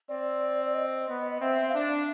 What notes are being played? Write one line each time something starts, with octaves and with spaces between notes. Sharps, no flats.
C4 D5
D5
D#5
B3
C4 E5
F5
D4 E5